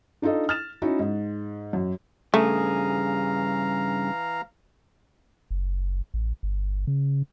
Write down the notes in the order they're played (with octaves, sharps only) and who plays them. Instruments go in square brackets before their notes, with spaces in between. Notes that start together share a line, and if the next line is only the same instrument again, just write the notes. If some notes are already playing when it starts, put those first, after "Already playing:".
[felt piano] D4 D#4 F4 A4 D#5
F6 A6 E7
C#4 D#4 E4 F#4
G#2
F#2
[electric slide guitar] G2 C#3 G#4 [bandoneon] E3 F5 A#5 [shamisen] A3
[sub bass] F#1
A1
G1
C#3